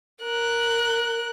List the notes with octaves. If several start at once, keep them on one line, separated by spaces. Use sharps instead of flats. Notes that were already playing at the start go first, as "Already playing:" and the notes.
A#4 F#6